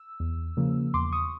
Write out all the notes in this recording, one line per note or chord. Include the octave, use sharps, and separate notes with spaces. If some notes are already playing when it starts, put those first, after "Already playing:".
Already playing: E6
E2
C#3 F3 A#3
E2 C6 D6
C#6 D#6